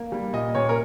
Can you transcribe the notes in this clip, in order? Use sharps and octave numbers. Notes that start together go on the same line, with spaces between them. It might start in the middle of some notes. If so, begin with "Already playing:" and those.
Already playing: A#3
G3
A#2 D#5
A#2 C#5
A#4